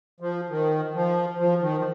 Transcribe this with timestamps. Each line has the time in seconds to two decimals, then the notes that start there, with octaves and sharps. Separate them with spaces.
0.20 F3
0.50 D#3
0.95 F3
1.39 F3
1.61 D#3
1.78 F3